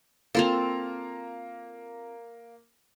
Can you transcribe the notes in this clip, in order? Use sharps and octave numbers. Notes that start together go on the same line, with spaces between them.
A#3 C4 F4 A4 F7